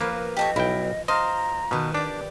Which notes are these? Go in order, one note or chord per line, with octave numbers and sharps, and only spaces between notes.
F3 A#3 A#4 B4
G4 A4 C#5 D#5
B1 E4 G5
C5 D#5 F5 A#5
B2 D#3 B4
D4 G4 D5